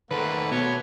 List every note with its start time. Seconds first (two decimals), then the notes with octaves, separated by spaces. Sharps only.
0.11 D#3 A3 A#3 A4 B4 C5 F#5
0.52 B2 B3 C#5